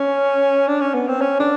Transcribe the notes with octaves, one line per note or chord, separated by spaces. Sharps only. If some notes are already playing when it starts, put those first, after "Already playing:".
Already playing: C#4
D4
C#4
B3
C4
C#4
D4